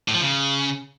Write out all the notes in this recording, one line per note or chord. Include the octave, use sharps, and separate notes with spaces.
A2
F3
C#3